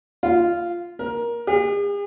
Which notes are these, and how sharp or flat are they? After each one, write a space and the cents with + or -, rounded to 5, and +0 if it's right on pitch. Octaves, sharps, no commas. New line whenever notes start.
F4 -10
A#4 +20
G#4 -45